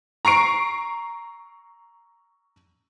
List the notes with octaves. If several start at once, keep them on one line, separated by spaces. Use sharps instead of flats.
A#5 C#6 C7 D7